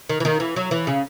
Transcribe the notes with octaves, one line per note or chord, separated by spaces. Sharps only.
D#3
E3
D#3
E3
F#3
E3
C#3